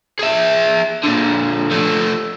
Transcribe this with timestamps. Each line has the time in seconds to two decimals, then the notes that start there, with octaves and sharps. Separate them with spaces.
0.19 G#4 E5
1.03 A#2 D3
1.71 F3 A3